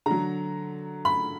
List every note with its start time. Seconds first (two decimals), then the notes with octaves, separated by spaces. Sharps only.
0.06 D3 F#3 A#5
1.05 B5